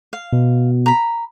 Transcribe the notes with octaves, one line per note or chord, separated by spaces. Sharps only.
F5
B2
A#5 B5